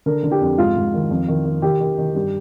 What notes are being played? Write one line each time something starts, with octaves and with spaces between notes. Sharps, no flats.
D3 A#4
D3
G4
F2
G#2 F4
G#2
D#3
F2
D#3
D#3
D#3 G4
D#3
D#3
G2